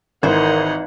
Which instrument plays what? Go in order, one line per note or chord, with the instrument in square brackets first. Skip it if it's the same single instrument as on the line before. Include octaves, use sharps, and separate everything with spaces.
[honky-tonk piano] G#1 [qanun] E3 C5 [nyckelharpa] D#4 F#5 [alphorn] A#4